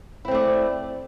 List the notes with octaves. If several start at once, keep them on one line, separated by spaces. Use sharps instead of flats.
A3 C4 E4 D5